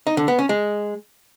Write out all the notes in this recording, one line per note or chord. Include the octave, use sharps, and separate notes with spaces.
D#4
D3
B3
C#4
G#3